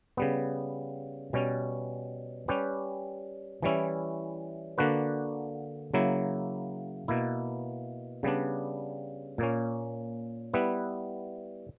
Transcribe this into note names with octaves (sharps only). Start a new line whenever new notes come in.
C#3 G3 B3
B2 G3 C#4
G3 C#4 G4 B4
E3 G3 C#4 E4
D3 A#3 D4 F#4 B4
C#3 F#3 A#3 E4
B2 A#3 E4
C#3 G3 B3 D4
A#2 A#3 C#4
G3 B3 E4 B4